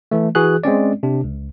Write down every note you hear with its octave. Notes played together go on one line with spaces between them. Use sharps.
E3 A3
E3 F#4 G#4 F#6
G#3 C4 C#4 D5
C3 D4
C#2